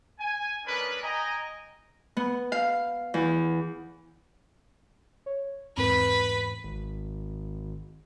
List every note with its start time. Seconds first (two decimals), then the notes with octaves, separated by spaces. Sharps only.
0.20 G#5
0.66 G#3 C#4 D4 A#4 B4
1.03 D#5 G5 G#5 A#5
2.17 B3
2.52 F5
3.14 E2
5.26 C#5
5.77 E2 G#2 C4 B4
6.64 G#1